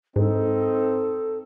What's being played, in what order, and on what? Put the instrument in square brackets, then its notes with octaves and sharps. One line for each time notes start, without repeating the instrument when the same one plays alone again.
[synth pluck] G#2 [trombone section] C4 D#4 [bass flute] A4